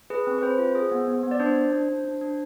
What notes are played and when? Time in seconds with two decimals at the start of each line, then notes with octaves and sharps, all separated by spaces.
0.10 G#4 B4
0.27 C4
0.38 B4
0.42 C4 C5
0.59 F4
0.75 G#4
0.91 B3
1.08 B3
1.23 B3
1.31 D5
1.40 D4 C5
1.57 D4
1.73 D4
1.89 D4
2.05 D4
2.21 D4